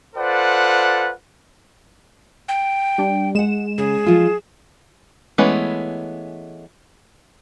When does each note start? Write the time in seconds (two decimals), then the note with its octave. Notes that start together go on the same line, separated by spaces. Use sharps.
0.16 F4 A4 B4 C5 D5 F#5
2.49 G5
2.98 G3 D4
3.35 G#3 G#4 F#5 E7
3.78 C#3 G#4
4.05 F3 F4 A4
5.38 E3 G#3 A3 B3 C#4